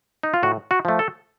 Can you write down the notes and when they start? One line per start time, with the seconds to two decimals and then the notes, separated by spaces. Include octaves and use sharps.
0.23 D#4
0.34 F4
0.43 A2 F#4
0.71 F#4
0.85 F3 A3
0.99 A4